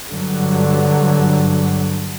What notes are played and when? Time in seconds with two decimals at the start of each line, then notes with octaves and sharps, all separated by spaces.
0.11 G2 D3 F#3